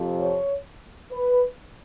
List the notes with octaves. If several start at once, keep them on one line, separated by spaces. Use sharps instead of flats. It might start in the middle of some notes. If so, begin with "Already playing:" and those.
Already playing: F2 C3 F3
C#5
B4